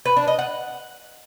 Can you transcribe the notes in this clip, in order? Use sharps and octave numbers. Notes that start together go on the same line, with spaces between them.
B4
D4
D#5
F#5